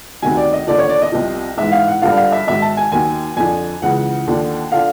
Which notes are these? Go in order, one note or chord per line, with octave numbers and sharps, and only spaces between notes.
D2 C3 D#3 F#3 G#5
D5
D#5
D#2 D3 F3 D5
C#5
D5
D#5
C2 C3 F3
G#2 E3 E5
F5
F#5
G2 D3 F3 F5
F5
E5
G#2 D#3 F#3 E5
A5
G#5
D#2 D#3 F#3 G#5
F2 D3 F3 G#5
C#2 C#3 E3 F#5
D#2 D3 F3
D3 F3 F5